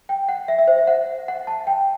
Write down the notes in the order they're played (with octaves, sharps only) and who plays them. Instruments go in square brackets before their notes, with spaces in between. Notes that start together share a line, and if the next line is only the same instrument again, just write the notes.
[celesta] G5
F#5
E5
E5
C5
E5
F#5
F#5
A5
G5